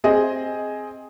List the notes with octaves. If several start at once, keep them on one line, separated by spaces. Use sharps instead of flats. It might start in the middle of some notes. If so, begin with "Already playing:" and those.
C4 G#4 D#5